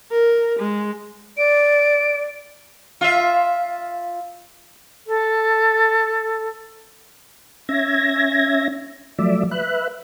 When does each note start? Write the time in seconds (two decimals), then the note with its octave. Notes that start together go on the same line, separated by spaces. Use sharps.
0.12 A#4
0.60 G#3
1.37 D5 D7
3.01 F4 E5
5.06 A4
7.69 C#4 E5 G#6 A#6
9.19 F3 F#3 A3 D5 E5
9.51 B4 E5 F#6